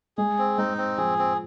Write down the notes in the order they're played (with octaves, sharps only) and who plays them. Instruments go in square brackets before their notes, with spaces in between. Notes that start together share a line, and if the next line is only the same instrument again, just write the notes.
[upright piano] G#3 [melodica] G#4
[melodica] C4
[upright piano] G#3 [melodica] D#4
[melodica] C4
[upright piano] F3 [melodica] G#4
[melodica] C4